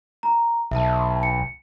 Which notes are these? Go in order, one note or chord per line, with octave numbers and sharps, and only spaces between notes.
A#5
B1 E5 A5
C#7